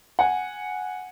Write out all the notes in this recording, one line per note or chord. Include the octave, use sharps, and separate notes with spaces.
F#5 G#5